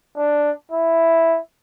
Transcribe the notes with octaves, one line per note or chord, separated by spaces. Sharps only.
D4
E4